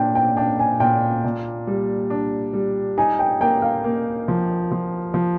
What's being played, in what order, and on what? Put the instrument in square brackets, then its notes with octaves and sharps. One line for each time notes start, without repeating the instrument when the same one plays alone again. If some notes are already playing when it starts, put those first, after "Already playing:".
Already playing: [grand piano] A#2 D4 [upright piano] G5
[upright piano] G5
[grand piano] D4 [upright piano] G5
[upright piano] G#5
[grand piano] A#2 [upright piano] G5
[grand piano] A#2
G3
D4
G3
[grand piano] D#4 [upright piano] G#5
[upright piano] G5
[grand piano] A#3 [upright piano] G5
[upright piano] F5
[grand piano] A#3
F3
F3
F3